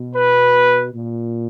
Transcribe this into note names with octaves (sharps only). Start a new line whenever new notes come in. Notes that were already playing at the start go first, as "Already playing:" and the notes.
Already playing: B2
B4
A#2